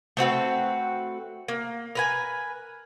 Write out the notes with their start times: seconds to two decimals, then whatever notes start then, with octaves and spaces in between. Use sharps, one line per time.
0.17 A3 C4 F#4 B4
1.48 A#3
1.95 A#4 B4 G#5